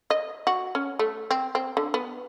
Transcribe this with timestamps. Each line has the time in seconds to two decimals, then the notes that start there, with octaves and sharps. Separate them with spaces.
0.10 D#5
0.47 F#4
0.75 C#4
0.99 A3
1.31 C4
1.55 C4
1.77 D3
1.94 B3